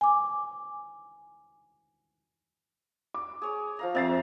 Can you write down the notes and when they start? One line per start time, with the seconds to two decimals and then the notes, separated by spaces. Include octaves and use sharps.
0.01 G#5 D6
3.14 D6
3.42 G#4 C#5
3.79 F3 F5 A#5
3.95 F2 C4 E5 A#5 A6 C7